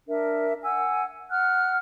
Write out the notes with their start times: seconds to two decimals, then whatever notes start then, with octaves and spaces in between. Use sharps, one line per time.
0.08 D4 A#4 E5
0.63 F#5 G#5 E6
1.30 F#5 F6 F#6